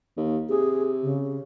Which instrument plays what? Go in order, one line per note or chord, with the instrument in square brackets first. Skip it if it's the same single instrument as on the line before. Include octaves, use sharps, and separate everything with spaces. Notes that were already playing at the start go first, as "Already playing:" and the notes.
[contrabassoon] D#2
[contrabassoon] C3 [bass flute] G#4
[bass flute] C#3